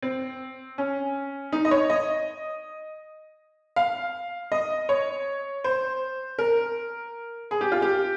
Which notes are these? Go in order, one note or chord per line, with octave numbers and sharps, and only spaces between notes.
C4
C#4
D#4
D#5
C#5
D#5
F5
D#5
C#5
C5
A#4
G#4
G4
F4
G4